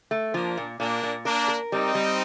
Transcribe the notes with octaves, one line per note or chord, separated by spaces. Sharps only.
A3
F3 A#3 D4
A#2
A#2 A#3 D4
A#2
A#3 D4 A#4
A#4
G3 C4 D#4
G3